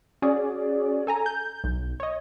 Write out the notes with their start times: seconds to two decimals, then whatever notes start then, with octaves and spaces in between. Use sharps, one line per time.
0.22 C#4 F#4 G#4 D5
1.07 A4 G#5 A#5
1.26 G6
1.64 B1
2.00 C#5 D#5